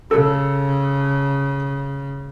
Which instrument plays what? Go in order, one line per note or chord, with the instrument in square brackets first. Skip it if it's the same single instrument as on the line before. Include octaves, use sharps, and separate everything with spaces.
[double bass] C#3 [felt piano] A4